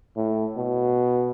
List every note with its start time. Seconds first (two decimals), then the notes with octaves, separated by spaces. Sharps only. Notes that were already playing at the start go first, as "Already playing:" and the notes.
0.16 A2
0.57 B2